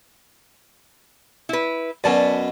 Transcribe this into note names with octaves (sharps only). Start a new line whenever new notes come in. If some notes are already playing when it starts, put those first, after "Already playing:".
E4 B4
F#2 B2 D5 A5